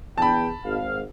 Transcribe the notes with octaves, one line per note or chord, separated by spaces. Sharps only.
E2 G5 A5 B5
G#1 F5